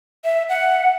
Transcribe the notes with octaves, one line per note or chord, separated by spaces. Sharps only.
E5
F#5